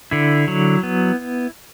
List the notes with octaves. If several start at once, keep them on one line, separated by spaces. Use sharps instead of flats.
D3 E4
F#3
B3